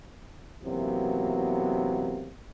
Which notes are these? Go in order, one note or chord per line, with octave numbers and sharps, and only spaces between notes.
F#2 C3 E3 F#3 A#3 B3